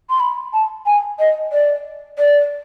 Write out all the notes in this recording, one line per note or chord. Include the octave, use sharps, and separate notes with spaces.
C6
B5
A5
G#5
D#5
D5
D5